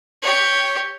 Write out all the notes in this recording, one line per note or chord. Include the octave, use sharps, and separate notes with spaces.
G4 C#5